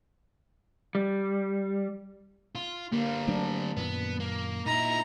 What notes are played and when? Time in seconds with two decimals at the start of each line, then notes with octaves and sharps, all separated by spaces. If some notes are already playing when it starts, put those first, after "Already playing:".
0.95 G3
2.55 F4
2.92 D3 G3 A#3
3.28 F#3 A3 C4 D4
3.77 F#2 A#2 D#3 B3
4.20 A#3
4.66 A#2 D#4 E4 A#5